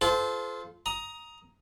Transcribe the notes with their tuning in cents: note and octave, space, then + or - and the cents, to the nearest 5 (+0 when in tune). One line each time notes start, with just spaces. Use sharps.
F4 +0 A4 -30 C5 -30
A#5 +10 D#6 +15